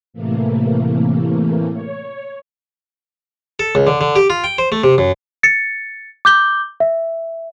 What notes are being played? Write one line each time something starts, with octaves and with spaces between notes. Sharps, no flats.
A2 C3 E3 A3 A#3
C#5
A4
C#2
D3
D3
G4
F4
G5
C5
A3
C3
F#2
A6 C#7
D6 G6 G7
E5